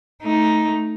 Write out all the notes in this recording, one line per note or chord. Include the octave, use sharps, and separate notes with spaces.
A3 D#4